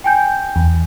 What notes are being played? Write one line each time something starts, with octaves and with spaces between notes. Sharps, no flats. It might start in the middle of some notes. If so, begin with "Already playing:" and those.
G5 G#5 G6
E2